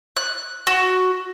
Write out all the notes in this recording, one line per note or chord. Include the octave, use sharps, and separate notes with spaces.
F#6
F#4